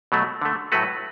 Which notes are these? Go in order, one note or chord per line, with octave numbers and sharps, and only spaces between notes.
B2 F#3 A3
D3 A3
A2 F#3 A3 F#4 B4